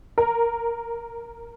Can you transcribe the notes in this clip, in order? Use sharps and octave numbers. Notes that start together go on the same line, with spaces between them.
A#4